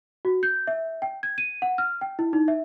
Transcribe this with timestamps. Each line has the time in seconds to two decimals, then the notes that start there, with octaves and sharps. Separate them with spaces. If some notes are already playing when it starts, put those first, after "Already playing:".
0.25 F#4
0.43 G6
0.67 E5
1.02 G5
1.23 G#6
1.38 D#7
1.62 F#5
1.78 F6
2.01 G5
2.19 E4
2.33 D#4
2.48 E5